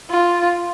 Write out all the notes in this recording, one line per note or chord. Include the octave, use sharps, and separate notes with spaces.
F4